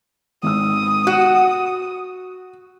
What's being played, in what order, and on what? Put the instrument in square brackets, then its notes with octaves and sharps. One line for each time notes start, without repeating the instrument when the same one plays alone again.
[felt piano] G#1 E6 [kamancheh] D#6
[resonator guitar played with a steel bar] F#4 [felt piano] F#6